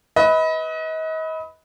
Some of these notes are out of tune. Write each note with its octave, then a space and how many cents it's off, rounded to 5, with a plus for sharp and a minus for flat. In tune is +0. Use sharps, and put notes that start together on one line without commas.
B4 +0 D#5 +35